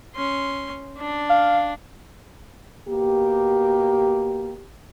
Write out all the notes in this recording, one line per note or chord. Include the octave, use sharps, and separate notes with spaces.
C#4 C6
D4
F5
B2 A#3 G4